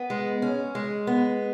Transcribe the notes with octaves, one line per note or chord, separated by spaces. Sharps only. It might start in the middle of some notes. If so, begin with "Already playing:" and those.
Already playing: B3
G#3
C#4
G#3
B3